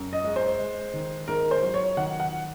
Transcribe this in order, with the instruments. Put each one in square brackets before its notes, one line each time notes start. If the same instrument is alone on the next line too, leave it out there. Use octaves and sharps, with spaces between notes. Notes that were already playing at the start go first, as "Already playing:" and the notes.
Already playing: [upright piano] F#2
D#5
G#3
C5
G#3
D#3
G#2 A#4
C5
F#3
C#5
D#3 F#5
F#5